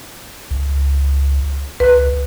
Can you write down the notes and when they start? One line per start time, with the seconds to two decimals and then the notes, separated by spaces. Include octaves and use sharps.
0.51 C#2
1.80 C#2 B4 F#6